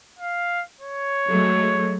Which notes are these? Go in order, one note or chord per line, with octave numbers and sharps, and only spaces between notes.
F5
C#5
F#3 G#3 A3